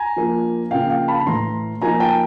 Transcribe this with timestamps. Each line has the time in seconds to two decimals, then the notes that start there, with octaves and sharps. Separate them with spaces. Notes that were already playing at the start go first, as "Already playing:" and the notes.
Already playing: G#5 A#5
0.17 F3 A#3 D4 F4
0.71 C#3 F3 A#3 D4 F4 F5 G5
0.90 F5 G5
1.08 A5 B5
1.27 A2 E3 A3 A#5 C6
1.82 F3 A#3 D#4 G#5 A#5
2.00 G5 A5